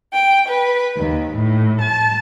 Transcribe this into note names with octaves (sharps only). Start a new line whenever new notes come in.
G5
B4
D#2
A2
A5